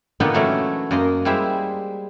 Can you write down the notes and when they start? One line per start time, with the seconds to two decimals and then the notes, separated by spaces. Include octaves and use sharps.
0.20 A#2 D3 B3 D#4 G4
0.33 E3 F#3 A3 C#4
0.91 F#2 A#3 D#5 C6
1.25 G3 G#3 E4 C5 E5